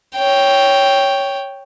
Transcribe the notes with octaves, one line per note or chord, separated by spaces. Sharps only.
C#5 G5